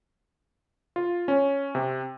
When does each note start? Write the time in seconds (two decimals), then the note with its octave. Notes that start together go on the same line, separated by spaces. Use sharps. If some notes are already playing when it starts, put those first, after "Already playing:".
0.96 F4
1.28 C#4
1.75 C3